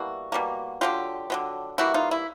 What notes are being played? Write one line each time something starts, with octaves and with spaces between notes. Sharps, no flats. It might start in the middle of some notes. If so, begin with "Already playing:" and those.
Already playing: B2 G3 A#3 E4 F#4
B2 G3 A#3
D3 F#3 B3 F4 G4
D3 F#3 B3
E3 G3 A#3 E4 F#4
D#4 F4
E4